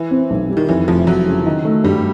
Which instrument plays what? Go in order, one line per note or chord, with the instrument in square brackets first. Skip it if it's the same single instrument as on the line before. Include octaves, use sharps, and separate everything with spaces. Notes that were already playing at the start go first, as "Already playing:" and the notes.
Already playing: [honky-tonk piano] E3
[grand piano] C4
B1
G3
[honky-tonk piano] D#3
[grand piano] F2 [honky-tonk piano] E3
[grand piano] F1 [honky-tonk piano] F3
[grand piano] F1 [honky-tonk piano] F#3
[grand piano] C#3
D#3
A3
[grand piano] G2 [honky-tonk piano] G3